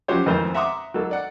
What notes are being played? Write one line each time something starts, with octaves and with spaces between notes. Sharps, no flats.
F3 F#3 C#4 G4 C5 C#5
G#1 F2 E3 A3 A#4 C5
E5 F#5 A#5 C6 D6 D#6
F#3 A#3 D#4 A4
D5 F#5